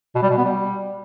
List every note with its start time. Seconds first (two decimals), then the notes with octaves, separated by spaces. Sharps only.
0.15 B2
0.22 G3
0.30 B2
0.37 B3
0.45 G3